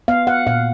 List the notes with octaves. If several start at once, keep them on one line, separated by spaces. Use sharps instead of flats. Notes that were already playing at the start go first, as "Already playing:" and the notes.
B3 F5
F#5
A#2 F5